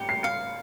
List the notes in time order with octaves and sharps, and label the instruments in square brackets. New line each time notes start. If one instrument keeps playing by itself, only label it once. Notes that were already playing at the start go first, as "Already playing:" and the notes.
Already playing: [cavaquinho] G4 [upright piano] C#7
[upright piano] C7
[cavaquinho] F5 [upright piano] C#7